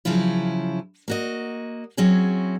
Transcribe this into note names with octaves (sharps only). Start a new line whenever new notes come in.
C#3 F3 F#3 E4 F4
A#3 F#4 D#5
F#3 C4 C#4 E4 G#4